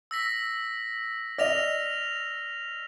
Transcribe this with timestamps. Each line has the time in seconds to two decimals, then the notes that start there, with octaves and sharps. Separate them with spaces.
0.11 E6 A#6 B6
1.38 D5 D#5 F6 A#6 F7